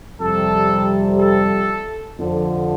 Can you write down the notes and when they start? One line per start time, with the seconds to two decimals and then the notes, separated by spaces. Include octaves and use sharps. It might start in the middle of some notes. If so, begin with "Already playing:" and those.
0.21 F2 C3 G3 A4
1.20 A4
2.20 F2 D3 F3